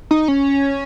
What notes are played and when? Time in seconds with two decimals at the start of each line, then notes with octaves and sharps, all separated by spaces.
0.11 D#4
0.28 C#4